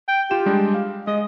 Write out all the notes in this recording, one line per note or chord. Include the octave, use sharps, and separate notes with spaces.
G5
F4 G4 G5 E7
G3 G#3 D4
F5
G#3 D#5